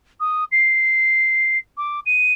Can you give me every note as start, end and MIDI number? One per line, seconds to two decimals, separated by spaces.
0.20 0.44 87
0.52 1.58 96
1.77 2.00 86
2.06 2.33 99